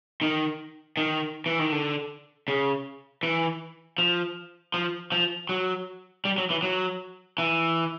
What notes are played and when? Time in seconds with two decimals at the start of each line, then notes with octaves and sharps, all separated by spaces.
0.22 D#3
0.97 D#3
1.46 E3
1.59 D#3
1.72 D3
2.48 C#3
3.23 E3
3.98 F3
4.74 F3
5.12 F3
5.49 F#3
6.25 G3
6.38 F#3
6.50 E3
6.63 F#3
7.38 E3